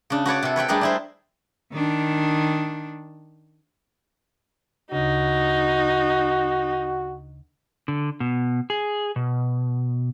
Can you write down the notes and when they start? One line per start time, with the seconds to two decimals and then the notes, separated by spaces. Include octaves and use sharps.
0.10 C#3 D4
0.26 F#4 B4 C#5 D5
0.43 C3 A4
0.56 B4 C#5 G5 B5
0.68 G3 A3 D4 G4 G#4 A#4
0.81 D4 E4 C5
1.72 D#3 D4
4.92 D2 C#3 D#4 F#4
7.88 D3
8.20 B2
8.70 G#4
9.16 B2